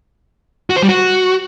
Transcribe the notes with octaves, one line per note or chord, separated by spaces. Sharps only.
F#4
C5
G3
F#4